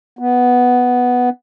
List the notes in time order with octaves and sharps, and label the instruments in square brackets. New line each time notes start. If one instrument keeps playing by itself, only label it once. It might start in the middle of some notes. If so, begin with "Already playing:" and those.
[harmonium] B3